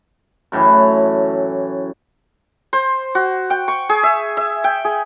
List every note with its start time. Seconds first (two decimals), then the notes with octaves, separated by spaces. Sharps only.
0.52 F#2 A2 E3 C#5
2.73 C5
3.15 F#4
3.50 G5
3.68 C#6
3.89 G#4
4.03 E5
4.37 E5
4.64 G5
4.85 G#4